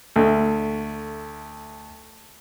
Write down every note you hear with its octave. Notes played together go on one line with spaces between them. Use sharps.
D2 A3